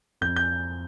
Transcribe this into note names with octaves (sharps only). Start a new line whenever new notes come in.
F2 G6
G6